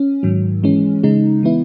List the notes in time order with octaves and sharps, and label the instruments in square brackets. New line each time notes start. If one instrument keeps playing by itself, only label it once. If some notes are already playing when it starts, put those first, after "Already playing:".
Already playing: [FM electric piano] C#4
G#2 D#3 F#3
E3 G#3 C#4
C#3 G#3 D#4
E3 B3 E4